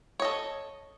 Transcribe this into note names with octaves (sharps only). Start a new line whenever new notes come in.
A4 C#5 D#5